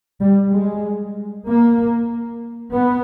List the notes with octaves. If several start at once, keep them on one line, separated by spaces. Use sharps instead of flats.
G3
G#3
A#3
B3